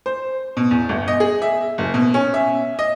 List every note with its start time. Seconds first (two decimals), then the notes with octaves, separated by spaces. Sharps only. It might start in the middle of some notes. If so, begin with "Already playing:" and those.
0.06 C5
0.57 B2
0.71 E2
0.89 G1
1.08 D#5
1.20 G#4
1.42 E5
1.78 F#1
1.94 B2
2.14 C#4
2.34 E5
2.79 D#5